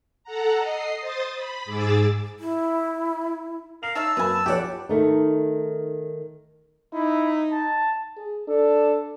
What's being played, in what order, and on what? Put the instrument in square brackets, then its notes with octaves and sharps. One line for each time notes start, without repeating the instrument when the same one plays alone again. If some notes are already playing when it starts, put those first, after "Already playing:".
[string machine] A4 F#5 A#5
D#5 C7
C5 D#6 A6
B5
G#2 G#4 D6 E6 A6
[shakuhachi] E4
[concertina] A#4 F5 [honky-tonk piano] F7
[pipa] D#4 C#5 E5 [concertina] A5 E6
[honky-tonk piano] F#2 A#3 B5 [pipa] B4 G#5
[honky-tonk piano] A#1 F3 C#5 [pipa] E3 A4 [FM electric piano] G4 D5 F#5
[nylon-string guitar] D#3 A3 D#4
[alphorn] D#4 [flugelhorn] E4
[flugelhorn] A5
[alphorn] G#4
[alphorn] D4 [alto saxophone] A4